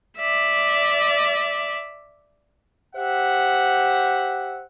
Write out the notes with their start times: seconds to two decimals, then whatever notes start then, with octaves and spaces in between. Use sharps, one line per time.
0.19 D5 E5
2.95 G4 C5 E5 F#5